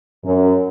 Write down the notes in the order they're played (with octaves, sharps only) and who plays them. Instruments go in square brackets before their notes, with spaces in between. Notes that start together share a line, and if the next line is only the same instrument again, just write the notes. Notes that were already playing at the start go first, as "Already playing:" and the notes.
[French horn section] F#2